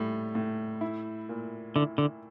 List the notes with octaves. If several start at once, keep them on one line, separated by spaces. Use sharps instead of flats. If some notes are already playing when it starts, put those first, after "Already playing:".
Already playing: A2 G3
A2
E4
A#2
D3 E4
D3